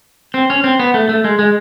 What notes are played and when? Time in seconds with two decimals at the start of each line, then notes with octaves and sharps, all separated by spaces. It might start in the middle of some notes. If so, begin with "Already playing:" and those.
0.34 C4
0.50 C#4
0.64 C4
0.79 B3
0.94 A3
1.09 A3
1.24 G#3
1.39 G#3